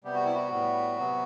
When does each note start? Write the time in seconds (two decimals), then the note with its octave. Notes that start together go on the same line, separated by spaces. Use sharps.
0.04 C3 G3 B3 G4
0.14 F#4
0.25 E4
0.34 F#4
0.51 A2 G3 B3
0.98 C3 F#3 B3